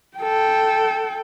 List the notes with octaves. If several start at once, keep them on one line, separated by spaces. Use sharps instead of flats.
A4 G5